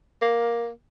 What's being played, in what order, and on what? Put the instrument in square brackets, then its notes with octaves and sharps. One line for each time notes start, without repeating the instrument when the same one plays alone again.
[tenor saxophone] A#3